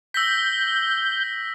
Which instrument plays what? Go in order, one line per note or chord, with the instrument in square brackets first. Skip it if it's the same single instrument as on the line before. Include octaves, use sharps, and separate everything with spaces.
[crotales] E6 A#6 B6 [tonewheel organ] G6